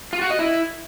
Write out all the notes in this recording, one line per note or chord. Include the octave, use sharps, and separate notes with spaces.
F4
F#4
D#5
E4